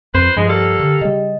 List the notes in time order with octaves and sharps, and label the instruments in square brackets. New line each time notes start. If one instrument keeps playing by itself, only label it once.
[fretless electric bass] F2 [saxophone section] B4 C5
[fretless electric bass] G2 F3 [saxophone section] G#3
[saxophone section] A#3 A4 [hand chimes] G4 D5
[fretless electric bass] D3 [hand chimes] G4
[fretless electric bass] C#3 G3 [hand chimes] D#5